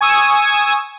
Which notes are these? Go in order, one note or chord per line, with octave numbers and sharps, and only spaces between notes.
G#5 C#6 D#6 E6 G#6